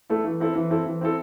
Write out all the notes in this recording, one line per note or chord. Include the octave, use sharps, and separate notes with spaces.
A3 E4 A4
E3
C4 E4 A4
E3
C4 E4 A4
E3
C4 E4 A4